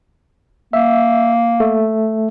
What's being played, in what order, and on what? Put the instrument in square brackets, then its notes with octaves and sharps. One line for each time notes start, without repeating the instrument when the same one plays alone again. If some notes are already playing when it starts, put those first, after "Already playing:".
[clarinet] A#3 [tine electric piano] E5
[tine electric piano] A3